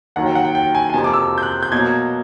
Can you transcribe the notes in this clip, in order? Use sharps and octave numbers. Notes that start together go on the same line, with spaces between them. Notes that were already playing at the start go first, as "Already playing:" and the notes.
D#2 D#3 F#3 F#5
G5
F#5
G5
G5
G#5
G#5
F2 C3 F3 A#3 A5
D6
E6
G6
F#6
G6
B2 F#3 A#3 G#6